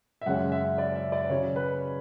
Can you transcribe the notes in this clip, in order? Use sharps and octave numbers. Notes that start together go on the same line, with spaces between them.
E5
F#2 C#3 G#3 C#4 F#5
E5
D5
E5
D5
C#3 F#3 C#4 C#5
B4